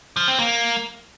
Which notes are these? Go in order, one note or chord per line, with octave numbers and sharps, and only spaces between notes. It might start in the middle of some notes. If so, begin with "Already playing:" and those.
F3
C4
A#3